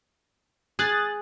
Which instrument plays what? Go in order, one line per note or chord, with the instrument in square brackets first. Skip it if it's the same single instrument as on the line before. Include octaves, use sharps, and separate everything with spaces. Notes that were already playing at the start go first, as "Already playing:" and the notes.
[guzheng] G#4 [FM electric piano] D#6 F#6 A6